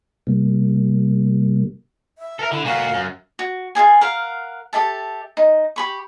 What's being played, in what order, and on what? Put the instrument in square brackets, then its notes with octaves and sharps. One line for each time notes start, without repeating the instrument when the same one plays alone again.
[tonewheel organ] C3 G3 A#3
[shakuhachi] E5
[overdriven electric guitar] A4 A#4
[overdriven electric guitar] D3 [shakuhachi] E4
[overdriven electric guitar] A#2 F#4 [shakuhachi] F5
[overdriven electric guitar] F#2
[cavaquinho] F#4
F4 F#4 G#4 G#5
A#4 F5 F#5
G4 A4 E5 A5
D#4
G4 B5 C#6